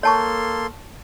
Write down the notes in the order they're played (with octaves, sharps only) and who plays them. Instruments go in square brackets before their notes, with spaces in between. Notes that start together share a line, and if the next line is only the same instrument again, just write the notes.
[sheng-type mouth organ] A#3 A4 C6 [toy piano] C#5 A5 C#6